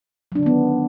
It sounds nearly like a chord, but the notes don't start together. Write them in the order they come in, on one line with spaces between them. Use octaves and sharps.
F#3 D4 D3 D#3 B3